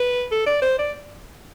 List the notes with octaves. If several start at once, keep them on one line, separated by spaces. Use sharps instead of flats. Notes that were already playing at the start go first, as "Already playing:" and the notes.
Already playing: B4
A4
D5
C5
D5